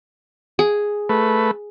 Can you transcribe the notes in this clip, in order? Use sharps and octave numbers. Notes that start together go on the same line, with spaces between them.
G#4
A3 B4